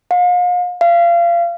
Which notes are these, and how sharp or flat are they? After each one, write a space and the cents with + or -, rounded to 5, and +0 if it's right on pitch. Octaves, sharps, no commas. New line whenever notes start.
F5 +40
F5 -30